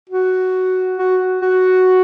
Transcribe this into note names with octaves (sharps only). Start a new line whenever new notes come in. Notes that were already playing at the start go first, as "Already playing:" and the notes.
F#4
F#4
F#4